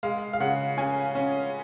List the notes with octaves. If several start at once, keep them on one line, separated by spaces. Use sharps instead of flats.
G#3 F5
F5
C#3 F#5
C#4 G#5
C#4